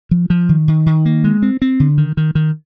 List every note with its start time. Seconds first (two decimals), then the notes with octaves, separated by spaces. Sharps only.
0.11 F3
0.30 F3
0.49 D#3
0.68 D#3
0.86 D#3
1.05 A#3
1.24 G#3
1.42 C4
1.62 C4
1.80 D3
1.98 D#3
2.17 D#3
2.35 D#3